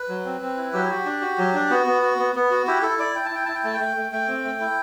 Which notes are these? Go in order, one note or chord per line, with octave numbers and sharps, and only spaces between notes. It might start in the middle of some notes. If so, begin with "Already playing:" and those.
Already playing: B4
F#3
C4
C4
E4
F#3 G4
F#4
D4
F#4
F#3
D4
B3 F#4
B3
F#4
B3
B3
F#4
E4 G4
E4 A4
E4 D5
E4 G5
A5
E4 G5
E4 A5
G5
A3 A5
G5
A3
A3
A3 G5
C4
A3
E4